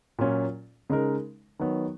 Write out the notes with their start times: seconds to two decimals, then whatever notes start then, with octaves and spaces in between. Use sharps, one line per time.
0.19 A#2 F#3 C#4 F4
0.90 C#3 G#3 D#4 A#4
1.59 D#3 F#3 B3